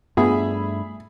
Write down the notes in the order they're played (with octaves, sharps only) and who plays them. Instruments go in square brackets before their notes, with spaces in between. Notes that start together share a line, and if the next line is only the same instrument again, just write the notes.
[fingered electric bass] G2 A3 D4 [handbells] B3 F4 [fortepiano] G#4 [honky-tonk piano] E5 B5